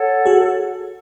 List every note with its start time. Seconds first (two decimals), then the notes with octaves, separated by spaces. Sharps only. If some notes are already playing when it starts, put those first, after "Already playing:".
Already playing: A4 C#5 F#5
0.26 F#4 G#4